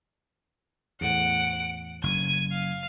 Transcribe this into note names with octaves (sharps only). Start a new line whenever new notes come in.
E2 A2 F#5 D7
F#1 G#6 D#7
F5